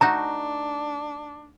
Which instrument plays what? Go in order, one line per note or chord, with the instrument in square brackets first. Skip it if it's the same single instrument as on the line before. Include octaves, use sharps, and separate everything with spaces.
[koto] A3 D#4 F#4 [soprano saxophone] D4 [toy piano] A#5